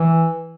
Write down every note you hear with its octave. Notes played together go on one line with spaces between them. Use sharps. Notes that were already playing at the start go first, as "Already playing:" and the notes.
Already playing: E3